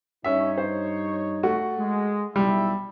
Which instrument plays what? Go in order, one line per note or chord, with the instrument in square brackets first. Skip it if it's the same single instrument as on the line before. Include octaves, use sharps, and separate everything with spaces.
[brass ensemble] G2 D#4 C#5 [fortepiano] C#4 E5
[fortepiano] C5
A3 F#4
[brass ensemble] G#3
[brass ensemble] B1 E4 E5 [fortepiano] G3